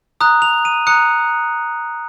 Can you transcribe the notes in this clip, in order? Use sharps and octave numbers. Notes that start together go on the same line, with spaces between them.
A#5 D#6 F#6
F7
D#7
A#5 D#6 F#6 C#7